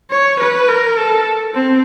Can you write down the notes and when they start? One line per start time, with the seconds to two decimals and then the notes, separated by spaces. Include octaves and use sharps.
0.11 C#5
0.40 B4
0.69 A#4
0.98 A4
1.54 C4